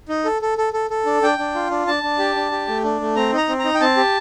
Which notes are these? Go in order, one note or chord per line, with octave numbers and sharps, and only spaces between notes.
D#4
A4
A4
A4
A4
A4
D4
D4 G5
D4
F4
D4
D4 A5
D4
G4
D4
G4
A3
D4
A3
C4 A#5
D#4
A#5
C4
A#5
D#4
G5
C4 A5
G4